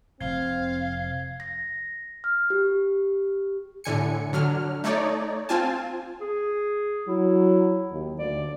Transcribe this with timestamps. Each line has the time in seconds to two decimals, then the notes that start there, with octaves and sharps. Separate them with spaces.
0.20 F1 C4 F5 G#6 C7 G7
1.40 A#6
2.24 F6
2.50 G4
3.84 A2 D3 G#5 C#7
4.33 D3 F#3 F6
4.84 A3 D#4 C#5 D5
5.49 C4 F4 G#5 A5
6.21 G#4
7.08 F#3 E4
7.91 D#2
8.19 D2 D5